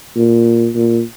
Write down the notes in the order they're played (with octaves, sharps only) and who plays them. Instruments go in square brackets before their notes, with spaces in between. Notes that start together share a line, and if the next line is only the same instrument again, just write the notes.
[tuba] A#2
A#2